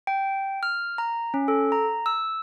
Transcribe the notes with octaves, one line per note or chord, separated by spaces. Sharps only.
G5
F6
A#5
C#4
A4
A#5
E6